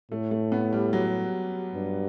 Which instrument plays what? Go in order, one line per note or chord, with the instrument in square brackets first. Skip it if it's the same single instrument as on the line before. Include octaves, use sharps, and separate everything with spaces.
[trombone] A2 [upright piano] A3
[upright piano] A3
B3
G3
F#3
[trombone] G2